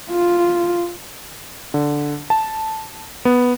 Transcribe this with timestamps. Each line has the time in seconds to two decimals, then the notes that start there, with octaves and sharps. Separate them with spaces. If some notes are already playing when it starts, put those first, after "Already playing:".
0.11 F4
1.74 D3
2.30 A5
3.25 B3